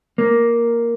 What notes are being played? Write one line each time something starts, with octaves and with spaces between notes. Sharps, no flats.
A#3